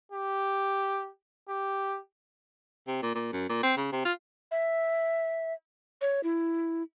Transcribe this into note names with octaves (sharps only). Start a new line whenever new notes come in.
G4
G4
C3
A#2
A#2
F#2
A#2
C4
C#3
C3
F4
E5
C#5
E4